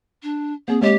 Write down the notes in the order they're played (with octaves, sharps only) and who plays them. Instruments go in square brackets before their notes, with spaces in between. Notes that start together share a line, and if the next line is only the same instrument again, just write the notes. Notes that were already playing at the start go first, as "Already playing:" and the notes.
[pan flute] D4
[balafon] A#3 C4 [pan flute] G#4
[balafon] G#3 C#5 D#5 [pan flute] G4